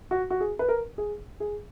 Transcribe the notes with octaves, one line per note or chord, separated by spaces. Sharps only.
F#4
F#4
G#4
B4
A#4
G#4
G#4